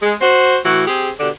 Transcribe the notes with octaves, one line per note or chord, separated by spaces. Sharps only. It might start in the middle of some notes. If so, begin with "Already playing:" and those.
G#3
F#4 C5
A2 E3 F#4
C4 G4 G#4
B2 D3 G4 D5